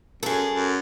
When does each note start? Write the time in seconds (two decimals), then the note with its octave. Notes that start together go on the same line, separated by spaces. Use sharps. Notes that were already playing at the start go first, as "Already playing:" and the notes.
0.23 F#2 G#4 A4
0.51 F#2